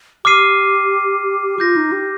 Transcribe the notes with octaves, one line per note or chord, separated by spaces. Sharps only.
G4 D6 F6 C7 D#7
F4 D6 G6 A#6
D#4
G4